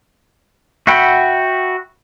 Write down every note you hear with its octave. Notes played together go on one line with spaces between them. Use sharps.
F#4 E5 F#5 G5 B5